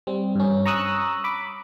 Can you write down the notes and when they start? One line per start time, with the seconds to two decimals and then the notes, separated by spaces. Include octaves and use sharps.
0.07 G3 C4
0.35 G2 C#4
0.66 A#5 C#6 D#6 E6 F#6
1.24 B5 D6